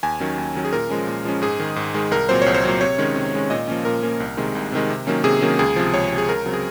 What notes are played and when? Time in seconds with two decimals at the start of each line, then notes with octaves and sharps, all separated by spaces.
0.03 D#2 G#5
0.20 D#3 F#3 C#4
0.38 D#2
0.55 D#3 F#3 C#4
0.65 G#4
0.73 A#2 A#4
0.90 F3 G#3 C#4
1.07 A#2
1.25 F3 G#3 C#4
1.42 G#2 G#4
1.60 D#3 G#3
1.76 G#2
1.94 D#3 G#3
2.11 C2 A#4
2.29 A#2 F#3 C4 C5
2.42 C2 C#5
2.54 C5
2.64 A#2 F#3 C4
2.81 C3 C#5
2.98 D#3 G#3 C#4
3.16 C3
3.33 D#3 G#3 C#4
3.50 A#2 D#5
3.68 F3 A#3 C#4
3.85 A#2 A#4
4.03 F3 A#3 C#4
4.20 C2
4.37 C3 D#3 G#3
4.55 C2
4.72 C3 D#3 G#3
4.90 C3
5.07 D#3 F#3 A#3 C#4
5.24 C3 G#4
5.41 D#3 F#3 A#3 C#4
5.59 C#2 G#4
5.76 C3 F3
5.94 C#2 C#5
6.11 C3 F3
6.18 G#4
6.28 C#2 A#4
6.46 C#3 F#3 C4
6.54 G#4